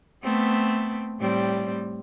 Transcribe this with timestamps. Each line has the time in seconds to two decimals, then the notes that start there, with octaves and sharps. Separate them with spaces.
0.23 A3 B3 C4
1.19 A2 G3 C4